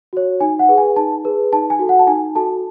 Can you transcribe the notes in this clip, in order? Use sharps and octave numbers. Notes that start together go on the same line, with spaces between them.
F#4 C#5
D#4 G#5
F#5
G#4 B4
G#5
D#4 A5
G#4 B4
D#4 A5
G#5
F#4 A4
F#5
A5
D#4 G#5
F#4 A4 A5